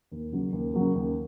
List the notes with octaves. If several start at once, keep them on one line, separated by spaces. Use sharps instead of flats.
D#2
C#3 F#3 A#3
D#2
C#3 F#3 A#3
D#2